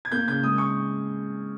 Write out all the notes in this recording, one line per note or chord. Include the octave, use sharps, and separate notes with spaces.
G#6
A#3 G6
C#3 G6
G#3 D#6
C#6